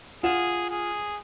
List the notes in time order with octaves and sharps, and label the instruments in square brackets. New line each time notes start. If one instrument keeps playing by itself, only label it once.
[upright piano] F4 F#5 E7 [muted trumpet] G#4
[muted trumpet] G#4